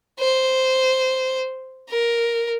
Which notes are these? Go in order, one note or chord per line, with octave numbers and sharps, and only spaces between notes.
C5
A#4